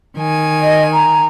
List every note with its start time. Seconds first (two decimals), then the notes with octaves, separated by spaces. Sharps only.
0.16 D#3 G#5
0.61 D#5
0.93 A#5